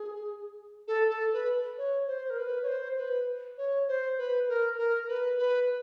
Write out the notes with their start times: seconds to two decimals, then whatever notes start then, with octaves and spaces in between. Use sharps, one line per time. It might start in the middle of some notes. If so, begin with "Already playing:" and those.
Already playing: G#4
0.88 A4
1.10 A4
1.33 B4
1.78 C#5
2.07 C5
2.30 A#4
2.38 B4
2.63 C#5
2.68 C5
2.98 B4
3.58 C#5
3.88 C5
4.18 B4
4.49 A#4
4.78 A#4
5.08 B4
5.38 B4